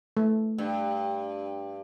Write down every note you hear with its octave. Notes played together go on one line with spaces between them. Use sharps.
A3
G2